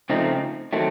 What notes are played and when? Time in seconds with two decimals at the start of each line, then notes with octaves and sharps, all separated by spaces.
0.10 C#3 F3 A3 C4 D#4
0.73 D#3 F#3 A3 C4